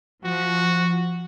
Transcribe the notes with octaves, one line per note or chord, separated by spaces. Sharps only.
F3 F#4